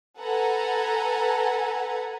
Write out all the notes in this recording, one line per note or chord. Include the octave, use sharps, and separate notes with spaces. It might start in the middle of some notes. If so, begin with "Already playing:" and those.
A4 B4 F#5 G#5 A#5